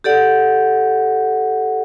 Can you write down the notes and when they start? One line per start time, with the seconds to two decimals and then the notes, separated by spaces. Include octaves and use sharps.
0.04 G4 A4 D5 F#5